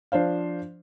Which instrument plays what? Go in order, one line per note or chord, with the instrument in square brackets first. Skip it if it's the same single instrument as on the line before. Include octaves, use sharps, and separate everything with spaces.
[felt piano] F3 D4 C5 F5